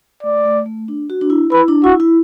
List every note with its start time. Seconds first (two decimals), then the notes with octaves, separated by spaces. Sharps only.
0.23 A3 D5
0.45 A3
0.66 A3
0.88 D4
1.10 F#4
1.21 D4
1.30 E4
1.52 E4 B4
1.68 D4
1.84 E4 F#4
2.00 E4